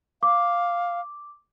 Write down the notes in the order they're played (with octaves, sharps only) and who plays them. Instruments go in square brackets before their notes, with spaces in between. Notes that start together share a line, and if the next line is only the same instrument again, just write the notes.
[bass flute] F5 [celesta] D6